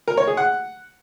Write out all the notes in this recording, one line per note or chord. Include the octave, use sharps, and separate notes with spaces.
A#4
C#5
G#4
F#5